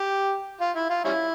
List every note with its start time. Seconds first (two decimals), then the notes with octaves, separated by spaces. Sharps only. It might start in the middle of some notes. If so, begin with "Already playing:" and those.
Already playing: G4
0.61 F4
0.76 E4
0.90 F4
1.05 G3 C#4 E4